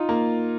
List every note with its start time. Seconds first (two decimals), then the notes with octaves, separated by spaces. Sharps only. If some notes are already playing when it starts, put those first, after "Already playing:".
Already playing: D#4 F4
0.09 A#3